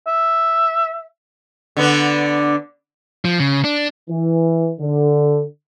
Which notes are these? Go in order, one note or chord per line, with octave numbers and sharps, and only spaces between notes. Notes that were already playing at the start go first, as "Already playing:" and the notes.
E5
D3 B3 D4
F3
C#3
D4
E3
D3